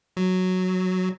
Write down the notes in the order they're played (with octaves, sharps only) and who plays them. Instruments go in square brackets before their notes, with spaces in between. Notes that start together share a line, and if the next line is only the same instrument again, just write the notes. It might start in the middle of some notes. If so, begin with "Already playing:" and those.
[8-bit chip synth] F#3